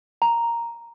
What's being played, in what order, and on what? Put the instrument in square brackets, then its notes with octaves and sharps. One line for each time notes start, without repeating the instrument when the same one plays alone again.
[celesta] A#5